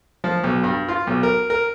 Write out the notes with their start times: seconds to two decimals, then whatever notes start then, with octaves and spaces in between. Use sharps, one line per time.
0.24 F3
0.44 B1
0.64 G2
0.89 F4
1.07 B1
1.23 A#4
1.50 A#4